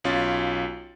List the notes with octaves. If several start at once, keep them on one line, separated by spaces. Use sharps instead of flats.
B1 C#4 F4 A6